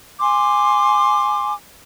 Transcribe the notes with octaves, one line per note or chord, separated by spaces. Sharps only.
G#5 C6 D6